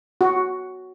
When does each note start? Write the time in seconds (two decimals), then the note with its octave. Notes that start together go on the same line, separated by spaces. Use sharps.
0.21 F#4